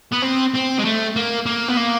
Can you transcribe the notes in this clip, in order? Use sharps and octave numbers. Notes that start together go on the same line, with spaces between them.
B3
C4
C4
G#3
A3
A#3
A#3
B3
A#3